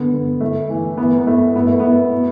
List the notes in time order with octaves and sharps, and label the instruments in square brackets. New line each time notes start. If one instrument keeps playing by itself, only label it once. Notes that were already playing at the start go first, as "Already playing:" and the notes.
Already playing: [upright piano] D3 B3
D3
A2 A3
E3
E3 B3
B3
A2 A3
A2 B3
A3
A2 B3
B2